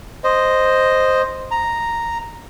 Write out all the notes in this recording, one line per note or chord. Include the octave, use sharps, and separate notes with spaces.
C5 D#5
A#5